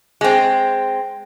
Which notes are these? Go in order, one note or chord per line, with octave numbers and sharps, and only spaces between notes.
G#3 C4